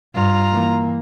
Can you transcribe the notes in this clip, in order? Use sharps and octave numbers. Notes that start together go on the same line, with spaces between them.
G2 F4 A#5
E3 A#3